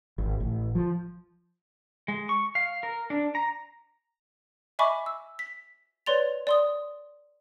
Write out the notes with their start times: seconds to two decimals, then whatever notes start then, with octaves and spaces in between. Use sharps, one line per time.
0.18 G#1
0.40 A1
0.75 F3
2.08 G#3
2.29 C#6
2.55 F5
2.83 A#4
3.10 D4
3.35 A#5
4.79 D#5 E5 G#5 B5 C#6 D6
5.06 E6
5.39 B6
6.06 B4 C#5 D5 C6 A6 F7
6.47 D5 C6 D#6